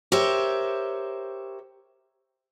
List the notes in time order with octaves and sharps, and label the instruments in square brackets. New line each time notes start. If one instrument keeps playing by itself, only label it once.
[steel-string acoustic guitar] G4 A#4 C5 C#5 E5